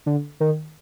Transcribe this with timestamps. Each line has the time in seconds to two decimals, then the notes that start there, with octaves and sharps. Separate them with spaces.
0.06 D3
0.40 D#3